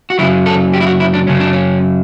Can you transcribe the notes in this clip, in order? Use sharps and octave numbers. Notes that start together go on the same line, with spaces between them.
F#4
F#2 C#3 F#3 E4
A4
G4
E4
F#4
E4
D4
F#2 C#3 F#3 C#4
D4
C#4